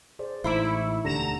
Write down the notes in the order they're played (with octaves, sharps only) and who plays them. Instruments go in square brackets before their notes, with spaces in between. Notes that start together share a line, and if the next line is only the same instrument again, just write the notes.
[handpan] G#4 C5 D5
[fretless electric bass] A1 [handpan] G#3 D#4 A4 [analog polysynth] E4 [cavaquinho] C5 B5 D6
[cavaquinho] C#6
[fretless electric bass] E1 D2 D3 [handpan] G4 [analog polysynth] A#5 E7